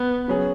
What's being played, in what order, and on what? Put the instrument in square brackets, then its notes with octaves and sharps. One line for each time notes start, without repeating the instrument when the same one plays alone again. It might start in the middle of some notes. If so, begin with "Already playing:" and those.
Already playing: [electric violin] B3
[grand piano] C#3 F#3 C#4 G#4